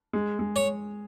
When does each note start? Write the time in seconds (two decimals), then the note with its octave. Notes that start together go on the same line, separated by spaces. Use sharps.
0.13 G#3
0.39 G#3
0.56 C#5